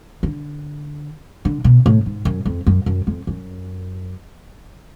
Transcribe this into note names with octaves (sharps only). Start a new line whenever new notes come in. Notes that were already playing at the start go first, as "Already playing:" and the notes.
D3
D3
B2
A2
G#2
F#2
F2
F#2
F#2
F2
F#2